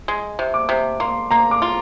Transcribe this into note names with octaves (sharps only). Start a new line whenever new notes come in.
G#3
C3
D6
C3
A#3 C6
A#3 A#5
D6
F4 C6